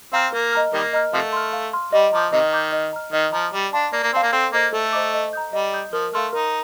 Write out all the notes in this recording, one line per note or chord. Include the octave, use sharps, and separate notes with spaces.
C4 F5 A#5 D6 F6
A#3 A#4
D#5 A#5 F6
D#3 G3 A#3 A#4
D#5 A#5 F6
C3 F3 A3 F5
C6 F6
F5
C6 F6
G3 D#5
F3 A#5 D6 G6
C3 D#3 D#5
A#5 D6 G6
D#5
A#5 F6
D#3 D#5
F3 A#5 F6
G3 D5
D4 F5 A5 C6
A#3 D5
A#3
C4 F5 A5 C6
A#3
C4 A4
A#3 C5 D#5 A#5 D6
A3 A4
C5 D#5 A#5 D6
D#5
A#5 D#6 G6
G3 D#5
A#5 D#6 G6
F3 A#4
A3 F5 C6 F6
D#4 A#4